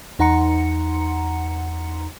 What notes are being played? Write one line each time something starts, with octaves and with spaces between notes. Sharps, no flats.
E2 D#4 F#5 A#5 C6 C#7